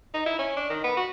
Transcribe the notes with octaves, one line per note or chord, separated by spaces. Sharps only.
D#4
E4
C#4
D4
D#3
B3
F#4